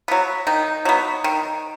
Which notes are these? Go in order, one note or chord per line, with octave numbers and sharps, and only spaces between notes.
F#3 B3
D#3 D#4
F#3 B3
D#3